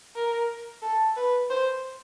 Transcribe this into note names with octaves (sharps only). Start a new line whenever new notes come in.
A#4
A4
B4
C5